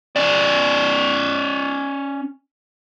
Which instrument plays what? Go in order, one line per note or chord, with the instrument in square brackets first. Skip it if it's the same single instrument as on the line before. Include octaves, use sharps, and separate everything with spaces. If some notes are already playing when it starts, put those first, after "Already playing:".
[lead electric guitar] C#4 D5